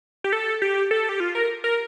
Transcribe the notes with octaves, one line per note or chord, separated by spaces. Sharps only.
G4
A4
G4
A4
G4
F4
A#4
A#4